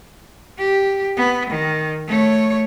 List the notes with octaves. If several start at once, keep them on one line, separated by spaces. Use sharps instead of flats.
G4
B3
D#3
A3 C#5